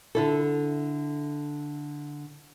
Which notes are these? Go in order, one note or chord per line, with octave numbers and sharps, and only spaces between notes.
D3 E4 A4